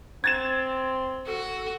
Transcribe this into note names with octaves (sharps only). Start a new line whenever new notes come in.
C4 G#6 A6 E7
F#4 A4